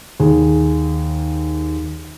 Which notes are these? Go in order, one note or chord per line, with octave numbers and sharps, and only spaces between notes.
D#2 G#4